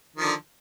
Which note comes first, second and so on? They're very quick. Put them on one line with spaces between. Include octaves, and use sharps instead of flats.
D#3 F3 D3